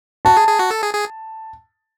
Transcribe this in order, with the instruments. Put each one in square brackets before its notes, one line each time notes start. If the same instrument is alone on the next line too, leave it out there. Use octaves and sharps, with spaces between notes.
[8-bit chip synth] F#4 [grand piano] A5
[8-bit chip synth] G#4
G#4
F#4
A4
G#4
G#4